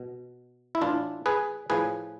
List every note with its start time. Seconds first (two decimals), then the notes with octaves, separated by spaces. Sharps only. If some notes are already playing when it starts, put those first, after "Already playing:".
Already playing: B2
0.75 E4
0.81 A2 E3 D4 F4
1.26 G#4 B4
1.70 A2 F3 G#4 B4